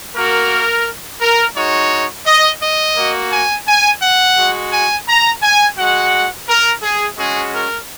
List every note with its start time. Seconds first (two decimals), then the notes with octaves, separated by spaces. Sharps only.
0.16 A#3 F#4 A#4
1.21 A#4
1.56 G#3 D#4 F#4 C#5
2.26 D#5
2.62 D#5
2.97 A#3 F#4
3.32 G#5
3.67 G#5
4.02 F#5
4.37 G#3 F#4
4.72 G#5
5.07 A#5
5.43 G#5
5.78 G#3 F#4 F#5
6.48 A#4
6.83 G#4
7.18 G#3 C#4 F#4 G#4
7.54 A#4